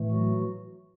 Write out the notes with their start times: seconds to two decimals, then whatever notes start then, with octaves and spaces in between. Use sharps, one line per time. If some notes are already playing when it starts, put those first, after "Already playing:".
Already playing: A2 E3 A3
0.11 F#3 F#4